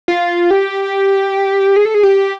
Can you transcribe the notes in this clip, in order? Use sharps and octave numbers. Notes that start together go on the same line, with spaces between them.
F4
G4
G#4
A4
G#4
G4